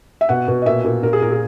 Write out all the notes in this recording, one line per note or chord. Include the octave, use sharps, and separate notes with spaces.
E5
B2 F#5
B2
D#5
A#2 E5
A#2
A#2 A#4
G#4
A#2 A#4
G#4